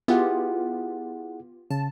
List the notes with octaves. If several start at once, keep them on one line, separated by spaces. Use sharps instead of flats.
B3 E4 F4 G4 G#4 F#5
C#3 A5